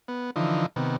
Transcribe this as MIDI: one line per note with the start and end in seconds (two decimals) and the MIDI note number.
0.08 0.31 59
0.36 0.66 50
0.36 0.66 52
0.36 0.66 53
0.36 0.66 63
0.76 0.96 48
0.76 0.96 51
0.76 0.96 59